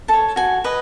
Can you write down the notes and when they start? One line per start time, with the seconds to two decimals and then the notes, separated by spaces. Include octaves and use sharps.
0.08 A4 C#5 A5
0.36 F#4 G#5
0.64 B4 D#5